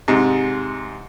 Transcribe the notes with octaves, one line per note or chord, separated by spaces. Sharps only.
G#2 C3